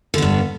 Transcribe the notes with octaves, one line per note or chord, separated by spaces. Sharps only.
G2 D3 B3